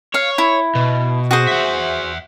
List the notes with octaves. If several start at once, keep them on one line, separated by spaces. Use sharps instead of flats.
C#5 F5
E4
B2
F#4 G#4 C5
E5 F#5